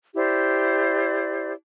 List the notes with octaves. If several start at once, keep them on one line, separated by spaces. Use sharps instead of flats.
E4 G4 C5 D5